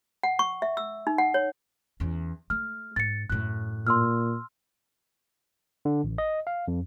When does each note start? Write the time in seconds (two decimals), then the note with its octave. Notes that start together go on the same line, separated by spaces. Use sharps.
0.23 F#5
0.39 C#6
0.62 E5
0.77 E6
1.07 D#4
1.18 F#5
1.34 C#5
2.00 E2 C#4
2.50 A3 F6
2.96 G#2 A6 C#7
3.30 F#2 A2 F#6
3.87 A#2 C6 E6 F6
5.85 D3
6.04 A1
6.18 D#5
6.47 F5
6.68 F2